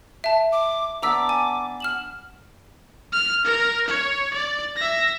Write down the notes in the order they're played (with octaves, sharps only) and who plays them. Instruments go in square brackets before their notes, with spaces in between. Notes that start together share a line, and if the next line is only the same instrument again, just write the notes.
[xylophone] E5 A5
[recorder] D6
[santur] B3 D4 A5 [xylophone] A#5 E6 B6 [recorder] D6
[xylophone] G#5
F6 E7 F#7
[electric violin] F6
A#4
C#5
D5
E5 A#6